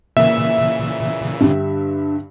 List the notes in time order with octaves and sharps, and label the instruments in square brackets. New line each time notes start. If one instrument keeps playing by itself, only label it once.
[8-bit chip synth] A#2 C#3 E3 [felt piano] A#3 [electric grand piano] E5
[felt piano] G2 D3 G4